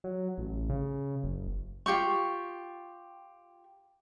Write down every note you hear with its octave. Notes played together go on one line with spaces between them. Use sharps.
F#3
A1
C#3
F#1
F4 G4 G5 C#6